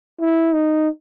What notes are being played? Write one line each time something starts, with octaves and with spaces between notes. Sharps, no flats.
E4
D#4